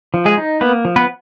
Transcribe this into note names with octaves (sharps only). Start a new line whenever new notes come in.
F3
G#3 G#4
D#4
A#3 B3 B4
F3
B3 B4